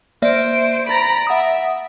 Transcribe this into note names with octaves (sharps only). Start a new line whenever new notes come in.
A#3 C5 D5 E5 D7
A#5 B5 A6 D7
E5 F#5 D#6